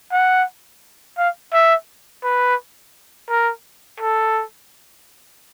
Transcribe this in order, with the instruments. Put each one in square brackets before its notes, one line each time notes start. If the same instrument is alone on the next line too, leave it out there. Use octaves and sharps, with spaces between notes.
[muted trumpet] F#5
F5
E5
B4
A#4
A4